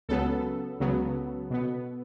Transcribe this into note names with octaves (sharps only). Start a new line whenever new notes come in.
C#2 C#3 F#3 B3 A4
C#2 C#3 F#3 B3
B2 B3